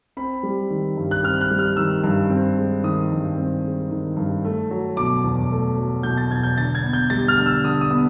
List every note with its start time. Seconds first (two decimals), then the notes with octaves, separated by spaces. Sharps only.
0.17 C4 B5
0.43 G3
0.70 D#3
0.97 G2
1.11 F#6
1.23 C4 F6
1.41 F#6
1.51 G3
1.59 F6
1.77 D#3 E6
2.04 G2
2.30 C4
2.58 G#3
2.83 D#3 D#6
3.11 G2
3.38 C4
3.64 G#3
3.91 D#3
4.17 G2
4.44 A3
4.71 F#3
4.97 B2 D6
5.24 E2
5.51 A3
5.78 F#3
6.03 B2 G6
6.17 A6
6.31 E2 G#6
6.43 G6
6.57 D3 A6
6.75 G#6
6.84 B3
6.93 G6
7.10 G3 A6
7.28 F6
7.38 D3
7.46 E6
7.64 D3 D#6
7.81 D#6
7.91 B3